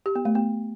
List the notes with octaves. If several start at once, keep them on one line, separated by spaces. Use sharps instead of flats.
G4
B3
A3
B3